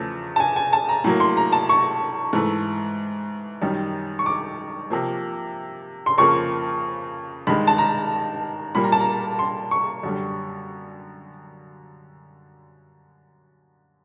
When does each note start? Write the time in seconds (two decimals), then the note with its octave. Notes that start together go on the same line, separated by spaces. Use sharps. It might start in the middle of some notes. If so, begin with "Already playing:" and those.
Already playing: E2 C#3 F3 A3
0.36 A5
0.40 G#5
0.56 G#5
0.73 A5
0.89 A#5
1.04 A2 F#3 A#3
1.20 C6
1.37 A#5
1.52 A5
1.69 C#6
2.33 G#2 E3 A3
3.62 F#2 D#3 G3
4.19 C#6
4.26 D6
4.90 C3 F3 A#3
6.06 C6
6.18 F2 C#3 F3 A#3 C#6
7.47 G2 D#3 G#3 B5
7.67 A5
7.78 A#5
8.75 A#2 G3 A#3 B5
8.84 A#5
8.92 A5
9.00 A#5
9.39 C6
9.71 C#6
10.03 F#2 D3 G3